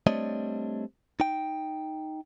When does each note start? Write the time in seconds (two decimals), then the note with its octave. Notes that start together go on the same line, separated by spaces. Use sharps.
0.07 G3 A3 C4 D4 C#5 D#5
1.20 D#4 G5